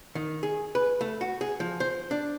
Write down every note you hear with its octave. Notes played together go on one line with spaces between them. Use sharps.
D#3
G#4
B4
A3
F#4
G#4
F3
C5
D4